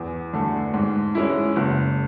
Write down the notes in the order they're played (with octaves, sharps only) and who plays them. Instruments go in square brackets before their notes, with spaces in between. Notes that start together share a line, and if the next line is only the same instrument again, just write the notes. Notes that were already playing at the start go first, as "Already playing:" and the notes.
Already playing: [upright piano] E2
D3 A3
G#2
G#3 C#4 E4
F#1